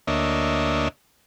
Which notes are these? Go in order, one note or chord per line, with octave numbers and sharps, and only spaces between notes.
D2 A#3 D4 C#5 D#5 E5